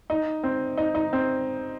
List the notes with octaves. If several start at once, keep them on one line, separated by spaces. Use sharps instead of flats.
D#4
C4
D#4
D#4
C4